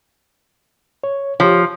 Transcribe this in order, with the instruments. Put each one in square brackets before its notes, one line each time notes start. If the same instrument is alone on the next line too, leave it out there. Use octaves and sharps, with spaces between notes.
[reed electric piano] C#5
[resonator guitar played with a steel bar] F3 [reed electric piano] G4 C#5